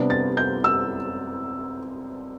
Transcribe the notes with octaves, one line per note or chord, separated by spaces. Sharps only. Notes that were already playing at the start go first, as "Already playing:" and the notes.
Already playing: C3 G3 B3 D4
A6
G6
E6